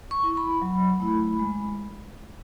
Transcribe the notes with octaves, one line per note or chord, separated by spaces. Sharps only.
C#6
E4
B5
F#3
A3 E4
G#3